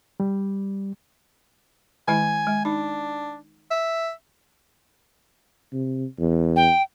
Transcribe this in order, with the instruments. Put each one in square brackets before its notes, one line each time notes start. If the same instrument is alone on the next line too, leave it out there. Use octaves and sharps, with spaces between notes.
[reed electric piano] G3
[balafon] D#3 G#3 E4 [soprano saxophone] G#5
[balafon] G#3
[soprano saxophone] D4 [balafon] D#4
[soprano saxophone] E5
[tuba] C3
E2
[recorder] G5